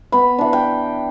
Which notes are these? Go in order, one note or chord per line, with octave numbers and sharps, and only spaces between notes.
B3 B5
E3 D4
G5